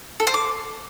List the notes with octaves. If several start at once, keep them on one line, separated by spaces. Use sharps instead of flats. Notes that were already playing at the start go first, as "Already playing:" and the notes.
A4
C5
D6